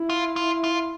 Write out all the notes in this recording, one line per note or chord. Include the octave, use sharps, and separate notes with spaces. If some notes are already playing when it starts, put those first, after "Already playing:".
Already playing: E4
F4
F4
F4